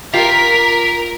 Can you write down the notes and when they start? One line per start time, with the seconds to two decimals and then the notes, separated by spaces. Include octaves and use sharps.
0.13 F4 G4 A#4 F5 B6